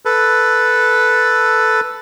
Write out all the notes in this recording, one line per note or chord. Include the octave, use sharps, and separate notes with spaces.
A4 B4